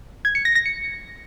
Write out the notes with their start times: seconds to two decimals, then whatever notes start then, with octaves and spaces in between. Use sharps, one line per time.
0.25 G#6
0.35 C#7
0.45 A#6
0.55 A#6
0.66 C#7